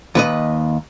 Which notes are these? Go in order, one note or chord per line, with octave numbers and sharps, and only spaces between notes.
D#2 B4 D#5